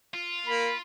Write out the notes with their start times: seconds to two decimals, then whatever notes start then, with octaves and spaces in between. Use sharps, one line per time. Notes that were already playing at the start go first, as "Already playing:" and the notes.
0.14 F4
0.46 A#3 B5